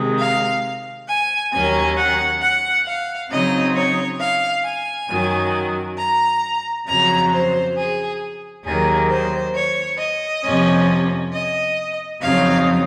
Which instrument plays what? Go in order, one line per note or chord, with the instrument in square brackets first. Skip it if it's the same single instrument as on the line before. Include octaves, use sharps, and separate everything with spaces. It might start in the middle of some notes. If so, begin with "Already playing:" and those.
Already playing: [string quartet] C3 D#3 G#3
F5
G#5
D#2 D#3 F#3 C#4 G#5
F#5
F#5
F5
C#3 F#3 C4 D#4 D#5
C#5
F5
G#5
F#2 D#3 F#3
A#5
F2 C#3 F#3 A#5
C5
G#4
D#2 D#3 F#3 A#3 G#4
C5
C#5
D#5
F2 C3 F3 A#3 C#4
D#5
F2 C#3 F#3 C4 D#4 F5